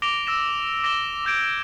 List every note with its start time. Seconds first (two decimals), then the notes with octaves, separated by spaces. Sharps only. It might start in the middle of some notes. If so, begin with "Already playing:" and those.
0.02 D6 A#6 D7 F7 G7
0.27 E6 A#6 E7
0.83 D6 A#6 E7 G7
1.25 D6 G6 G#6 D7